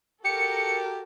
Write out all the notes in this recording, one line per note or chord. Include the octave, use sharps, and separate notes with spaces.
F#4 G4 A4 A#4 C#7